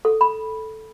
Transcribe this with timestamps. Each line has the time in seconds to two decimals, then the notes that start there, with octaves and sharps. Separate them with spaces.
0.05 A4
0.21 B5